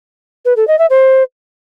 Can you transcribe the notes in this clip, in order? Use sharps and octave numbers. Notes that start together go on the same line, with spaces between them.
B4
A4
D#5
E5
C5